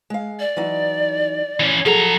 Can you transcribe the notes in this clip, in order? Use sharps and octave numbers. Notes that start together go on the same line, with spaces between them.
G#3 F5
D5
E3 F#3 D#4
E3 C#4
F3 F#3 G#4 A4 A#5